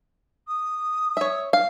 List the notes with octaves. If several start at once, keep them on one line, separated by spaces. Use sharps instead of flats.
D#6
C#5 E5
F5